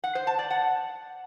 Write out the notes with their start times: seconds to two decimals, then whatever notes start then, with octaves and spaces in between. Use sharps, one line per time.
0.04 F#5
0.15 C5
0.27 A5
0.39 D5
0.50 F#5